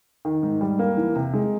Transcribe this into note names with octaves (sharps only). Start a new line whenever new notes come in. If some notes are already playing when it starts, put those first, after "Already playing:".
D#3
G#2
G3
A#3
E3
C3
G#3